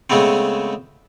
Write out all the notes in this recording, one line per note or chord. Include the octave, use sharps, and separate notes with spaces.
C#3 G#3 A3 B3 C4